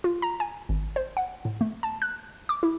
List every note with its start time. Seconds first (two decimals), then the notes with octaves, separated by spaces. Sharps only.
0.04 F4
0.22 A#5
0.40 G#5
0.69 G#1
0.96 C5
1.17 F#5
1.45 A2
1.61 A3
1.83 A5
2.02 F#6
2.49 D6
2.63 E4